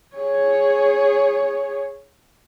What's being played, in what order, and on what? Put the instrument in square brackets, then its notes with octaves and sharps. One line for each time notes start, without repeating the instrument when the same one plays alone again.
[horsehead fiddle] G#4 C#5